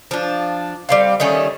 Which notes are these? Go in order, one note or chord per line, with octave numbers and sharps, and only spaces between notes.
F3 D4
G3 C4 F5
D#3 G3 A3 C#4